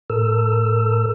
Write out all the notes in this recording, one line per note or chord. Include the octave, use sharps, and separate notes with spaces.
A2 A4 A#4 E6